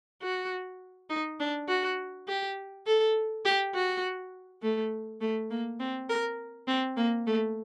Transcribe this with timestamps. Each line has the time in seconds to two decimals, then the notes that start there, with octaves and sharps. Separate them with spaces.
0.22 F#4
1.10 D#4
1.40 D4
1.69 F#4
2.28 G4
2.87 A4
3.45 G4
3.75 F#4
4.62 A3
5.21 A3
5.51 A#3
5.80 C4
6.09 A#4
6.68 C4
6.97 A#3
7.26 A3